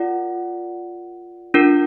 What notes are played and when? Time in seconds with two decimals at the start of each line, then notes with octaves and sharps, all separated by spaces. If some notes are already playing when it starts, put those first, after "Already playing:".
Already playing: F4 A#4 D5 F#5
1.54 D4 F4 A#4